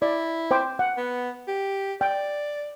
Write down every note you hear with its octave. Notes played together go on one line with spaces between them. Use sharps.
E4 D5
C5 G5 D6
F#5
B3
G4
D5 G5